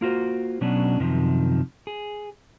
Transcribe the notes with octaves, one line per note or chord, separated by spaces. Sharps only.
A#3 F4 F#4 C5
B2 F#3 B3 C#4 D4
F#2 C3 D#3 F3
G#4